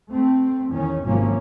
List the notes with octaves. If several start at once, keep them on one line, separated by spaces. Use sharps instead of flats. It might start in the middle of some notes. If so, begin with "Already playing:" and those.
A3 C4
E2 D#3 C#4
G#1 C3 F3 F#3 A#3 C#4